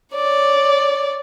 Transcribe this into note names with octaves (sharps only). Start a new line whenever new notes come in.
C#5 D5